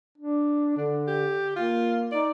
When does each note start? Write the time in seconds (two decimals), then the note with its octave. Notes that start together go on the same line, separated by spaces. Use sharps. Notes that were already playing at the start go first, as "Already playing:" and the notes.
0.18 D4
0.77 D3 D4
1.07 G4
1.56 A#3 F4
2.12 D#4 D5